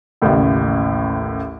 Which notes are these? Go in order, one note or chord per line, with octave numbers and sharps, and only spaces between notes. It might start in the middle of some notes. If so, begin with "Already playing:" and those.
A1 D#2 A2 C#3